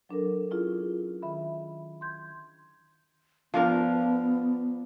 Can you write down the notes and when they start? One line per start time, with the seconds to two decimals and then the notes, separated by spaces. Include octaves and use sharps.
0.09 F#3 D4 A4 A#4
0.50 C#4 E4 F4 G#4
1.22 D#3 E5 B5
2.01 C6 G6 G#6
3.54 F3 B3 D4 A#4